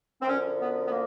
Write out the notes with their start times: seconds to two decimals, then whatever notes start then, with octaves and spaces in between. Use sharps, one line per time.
0.22 C4
0.28 F#2 D3 F3 C#4
0.60 B3
0.86 B3
0.91 A#3